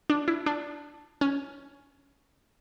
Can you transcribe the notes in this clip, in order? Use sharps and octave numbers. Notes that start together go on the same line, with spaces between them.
D4
E4
D4
C#4